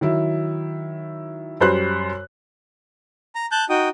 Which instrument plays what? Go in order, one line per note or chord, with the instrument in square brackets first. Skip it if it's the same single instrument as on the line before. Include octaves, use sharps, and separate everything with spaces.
[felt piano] D#3 F#3 E4
F#2 G3 C5 B5 F#6
[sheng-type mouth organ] A#5
A5 F#6 G6
D#4 F#4 G5 D#6